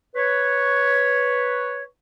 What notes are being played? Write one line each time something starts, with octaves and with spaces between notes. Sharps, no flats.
B4 C#5